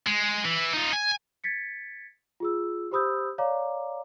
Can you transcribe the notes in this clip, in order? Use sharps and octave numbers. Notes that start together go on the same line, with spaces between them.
G#3
E3
D#4 F4
G#5
G#6 A6 B6 C#7
F4 G#4 E6
G4 C5 B5 D#6 E6 G6
C#5 D5 F5 A#5 D6